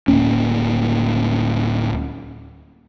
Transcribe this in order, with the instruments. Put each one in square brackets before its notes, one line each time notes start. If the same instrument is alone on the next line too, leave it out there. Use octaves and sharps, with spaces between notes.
[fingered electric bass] D1 G1 A#3 C#4